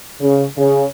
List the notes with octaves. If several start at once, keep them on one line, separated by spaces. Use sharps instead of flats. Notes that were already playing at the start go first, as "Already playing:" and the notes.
C#3
C#3